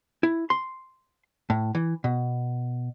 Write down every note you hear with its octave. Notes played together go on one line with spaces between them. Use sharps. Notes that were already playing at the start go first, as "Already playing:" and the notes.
E4
C6
A2
E3
B2